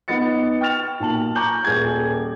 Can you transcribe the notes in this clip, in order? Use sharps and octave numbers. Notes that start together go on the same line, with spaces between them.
B3 D#4 A6 C#7
G5 C#6 F6 A6 F7
B1 A#2 A5 F#7
A#5 C#6 D6 G6 F#7
D#1 G#4 G#6